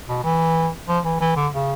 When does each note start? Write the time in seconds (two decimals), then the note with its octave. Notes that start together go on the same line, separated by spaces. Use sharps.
0.09 B2
0.24 E3
0.88 F3
1.05 E3
1.21 E3
1.36 D3
1.53 C#3